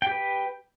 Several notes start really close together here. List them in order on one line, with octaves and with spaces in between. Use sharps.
G5 G4 B4